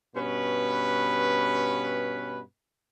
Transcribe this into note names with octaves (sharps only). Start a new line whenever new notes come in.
G2 B2 C#4 B4